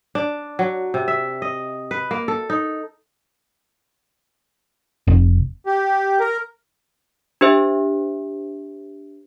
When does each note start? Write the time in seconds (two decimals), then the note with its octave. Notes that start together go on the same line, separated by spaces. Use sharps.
0.15 D4
0.59 F#3
0.94 C3
1.08 E5
1.42 D#5
1.91 B4
2.11 A#3
2.28 A4
2.50 D#4
5.07 F1
5.66 G4
6.20 A#4
7.41 D4 G4 C5 E5